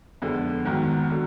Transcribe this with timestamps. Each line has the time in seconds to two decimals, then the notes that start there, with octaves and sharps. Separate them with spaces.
0.22 F2 D3 G#3 B3
0.65 G#2 D#3 F#3 B3
1.10 D3 F#3